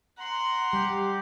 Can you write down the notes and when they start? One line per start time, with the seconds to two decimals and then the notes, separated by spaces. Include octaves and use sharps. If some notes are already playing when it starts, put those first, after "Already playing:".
0.19 F#5 A#5 C6
0.73 G3 G4